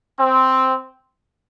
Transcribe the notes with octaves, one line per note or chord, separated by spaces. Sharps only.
C4